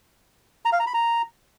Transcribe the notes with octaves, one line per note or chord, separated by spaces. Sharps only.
A#5
F5
A#5
B5
A#5